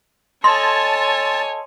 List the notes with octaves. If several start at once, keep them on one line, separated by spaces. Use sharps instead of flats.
A4 C#5 D#5 G#5 A5 C6